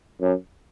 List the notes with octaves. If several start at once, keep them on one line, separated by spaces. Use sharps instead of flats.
F#2